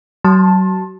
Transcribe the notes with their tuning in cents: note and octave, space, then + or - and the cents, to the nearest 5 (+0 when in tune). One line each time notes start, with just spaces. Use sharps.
F#3 +30 A5 +0 C6 +30